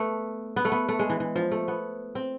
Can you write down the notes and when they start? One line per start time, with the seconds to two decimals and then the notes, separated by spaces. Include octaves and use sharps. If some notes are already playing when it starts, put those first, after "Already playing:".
Already playing: A3 B3
0.56 B3
0.65 A3
0.72 B3
0.89 A3
0.99 G#3
1.10 E3
1.20 E3
1.36 F3
1.51 A3
1.68 B3
2.15 C4